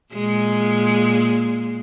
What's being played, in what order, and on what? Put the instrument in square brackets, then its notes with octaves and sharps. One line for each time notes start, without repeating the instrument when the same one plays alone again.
[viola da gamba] A#2 G#3